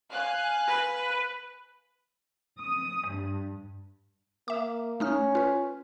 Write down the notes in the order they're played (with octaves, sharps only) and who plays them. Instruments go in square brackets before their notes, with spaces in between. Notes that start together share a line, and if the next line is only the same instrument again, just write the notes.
[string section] F5 G#5 F#6
[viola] B4
[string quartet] D#6
G2
[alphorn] A#3 [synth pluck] E5 D6
[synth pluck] A3 D#4 F6 [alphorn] C#4
[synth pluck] F4 B4